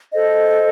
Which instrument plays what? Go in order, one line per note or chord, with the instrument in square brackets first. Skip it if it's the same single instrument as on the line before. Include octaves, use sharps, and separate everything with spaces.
[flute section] A4 C5 D#5